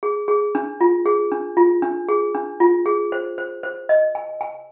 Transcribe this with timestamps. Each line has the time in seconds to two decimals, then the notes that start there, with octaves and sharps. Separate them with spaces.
0.03 G#4
0.28 G#4
0.55 D4
0.81 F4
1.06 G#4
1.32 D4
1.57 F4
1.82 D4
2.09 G#4
2.35 D4
2.60 F4
2.86 G#4
3.12 C5
3.38 C5
3.63 C5
3.89 D#5
4.15 G#5
4.41 G#5